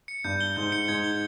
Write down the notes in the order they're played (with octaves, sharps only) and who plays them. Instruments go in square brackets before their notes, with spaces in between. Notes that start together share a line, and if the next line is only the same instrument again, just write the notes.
[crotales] C#7
[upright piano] G2 [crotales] G6
[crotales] G7
[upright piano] G#2 [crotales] G6
[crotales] C#7
[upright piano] G#2 [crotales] G#6
[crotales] G7